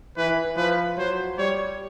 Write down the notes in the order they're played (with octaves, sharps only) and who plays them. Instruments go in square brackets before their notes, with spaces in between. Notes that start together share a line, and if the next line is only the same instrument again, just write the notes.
[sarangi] E3 [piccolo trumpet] B4
[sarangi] F3 [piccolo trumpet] B4
[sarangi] F#3 [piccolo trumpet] C5
[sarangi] G3 [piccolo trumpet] C#5